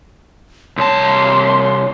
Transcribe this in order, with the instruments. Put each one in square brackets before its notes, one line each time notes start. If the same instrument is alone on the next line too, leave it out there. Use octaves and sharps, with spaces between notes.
[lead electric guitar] C2 A5 [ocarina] C#5 [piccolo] C6